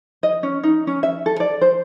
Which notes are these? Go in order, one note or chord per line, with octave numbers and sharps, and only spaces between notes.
D#5
C#4
D#4
C#4
E5
A4
D5
C5